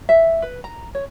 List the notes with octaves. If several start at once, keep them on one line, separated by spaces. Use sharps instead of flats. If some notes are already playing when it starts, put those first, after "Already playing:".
E5
B4
A#5
C#5